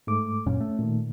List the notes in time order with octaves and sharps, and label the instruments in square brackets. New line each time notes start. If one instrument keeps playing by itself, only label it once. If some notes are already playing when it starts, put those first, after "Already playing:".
[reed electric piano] G#2 A3 D6
[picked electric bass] F#2 A#2 [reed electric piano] C#4
[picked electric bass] A3
[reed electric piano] A#2 D#3